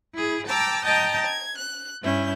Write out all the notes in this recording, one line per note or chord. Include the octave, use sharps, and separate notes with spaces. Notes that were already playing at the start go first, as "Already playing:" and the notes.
E4 G#4
G5 A5 A#5 D6 E6
D#5 G5 A5 A#5 D#6 G6
G#6
F#6
G2 C#4 E4 G6